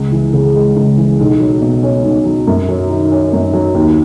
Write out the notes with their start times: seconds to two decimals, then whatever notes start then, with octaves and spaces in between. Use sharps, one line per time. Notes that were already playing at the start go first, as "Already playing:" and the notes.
Already playing: C#2
0.12 E3
0.33 C#3
0.55 G#3
0.76 C#2
0.97 E3
1.19 B1
1.40 F#3
1.61 B2
1.83 C#4
2.04 B1
2.25 F#3
2.47 F#2
2.69 F#3
2.90 D#3
3.11 C#4
3.33 F#2
3.53 F#3
3.75 D#2